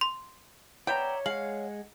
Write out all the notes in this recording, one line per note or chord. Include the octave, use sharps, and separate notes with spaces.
C6
B3 C#5 D5 E5 G5 A#5
G#3 F5 F#5 F#7